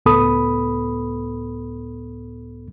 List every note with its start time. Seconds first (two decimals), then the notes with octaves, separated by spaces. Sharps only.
0.06 C#2 A2 B3 A4 B5 D#6